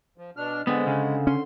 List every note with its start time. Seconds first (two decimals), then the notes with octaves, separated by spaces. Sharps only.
0.18 F3
0.37 B2 D4 F6
0.67 D3 G#3 B3 C4
0.87 C#3
1.27 C#4 C6